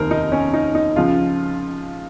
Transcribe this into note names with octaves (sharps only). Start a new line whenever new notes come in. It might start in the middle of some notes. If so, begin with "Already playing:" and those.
Already playing: F1 D#2 D#3 A#4 C5
D#4
C#4
D#4
D#4
C#2 C#3 F3 F4